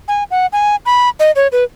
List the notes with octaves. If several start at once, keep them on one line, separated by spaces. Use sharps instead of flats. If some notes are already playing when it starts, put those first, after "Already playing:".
G#5
F#5
G#5
B5
D#5
C#5
B4